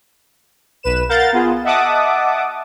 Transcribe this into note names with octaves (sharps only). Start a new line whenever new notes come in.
B1 B4 E7
A#4 F5 F#5 A#5 G6 A6
B3 F4 G#4
D#5 E5 F#5 A5 D6 D#6